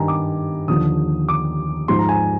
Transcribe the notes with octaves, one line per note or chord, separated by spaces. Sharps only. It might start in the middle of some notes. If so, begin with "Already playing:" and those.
Already playing: G2 D#3 G3 G#5 A#5
D6
D#2 D3 F3 D#6
D6
G#2 F3 C6
A#5
G#5